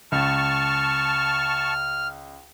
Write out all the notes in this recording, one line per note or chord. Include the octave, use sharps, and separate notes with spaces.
C#2 A5 C#6 F6